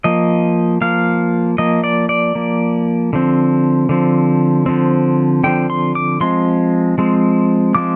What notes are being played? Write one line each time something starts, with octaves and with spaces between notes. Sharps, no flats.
F3 A#3 D#5
F3 A#3 F5
F3 A#3 D#5
D5
D5
F3 A#3
D3 F3 C4
D3 F3 C4
D3 F3 C4
D3 F3 C4 G5
C6
D6
F3 G#3 C4 C6
F3 G#3 C4
F3 G#3 C4 D6